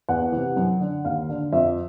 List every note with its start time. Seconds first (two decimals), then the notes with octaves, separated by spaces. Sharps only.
0.09 E2 F#5
0.32 C3 E3
0.56 F#2
0.80 D3
1.05 D#2 F5
1.29 D3
1.53 F2 E5